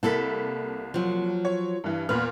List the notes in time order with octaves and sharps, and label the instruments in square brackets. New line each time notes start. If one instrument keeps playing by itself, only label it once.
[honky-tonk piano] C2 A#3 B6 [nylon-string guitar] E4 A4
[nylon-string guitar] F3 F#3
[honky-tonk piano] C#5
G2 E3
[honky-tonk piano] E2 A#2 F6 [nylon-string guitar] B4